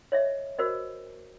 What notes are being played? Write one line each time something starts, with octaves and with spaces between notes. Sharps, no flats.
C#5 D#5 E5
F#4 A#4 C5 D#5